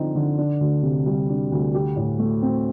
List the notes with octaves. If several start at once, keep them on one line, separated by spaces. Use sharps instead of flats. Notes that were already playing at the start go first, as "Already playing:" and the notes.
Already playing: D3 F3 C4 D#4
D3
D4
D2
C3
G3
D4
D2
G4
A2
A3
C4